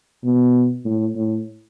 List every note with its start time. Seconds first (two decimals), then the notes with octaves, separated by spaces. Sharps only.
0.24 B2
0.85 A2
1.16 A2